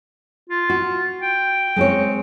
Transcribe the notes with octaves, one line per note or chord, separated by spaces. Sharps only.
F4
F#4
G5
G#3 C4 C#5